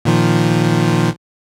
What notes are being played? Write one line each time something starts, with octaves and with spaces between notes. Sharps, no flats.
A#2 D#3 F3